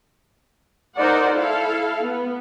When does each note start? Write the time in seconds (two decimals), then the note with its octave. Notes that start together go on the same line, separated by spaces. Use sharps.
0.97 D#4 A#4 C5 D5 F#5
1.36 E4 A4 F5
2.05 B3